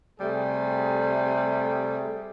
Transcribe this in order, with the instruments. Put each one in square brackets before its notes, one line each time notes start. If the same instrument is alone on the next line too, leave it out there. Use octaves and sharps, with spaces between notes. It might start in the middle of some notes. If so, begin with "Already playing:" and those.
[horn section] C3 G3 A3 G#4